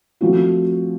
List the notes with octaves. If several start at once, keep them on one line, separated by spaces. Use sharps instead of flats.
F3 A3 C4 F#4